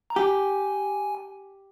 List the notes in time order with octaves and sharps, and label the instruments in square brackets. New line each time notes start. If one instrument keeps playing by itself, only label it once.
[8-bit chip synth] A#5
[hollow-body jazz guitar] G4 [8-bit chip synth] G#5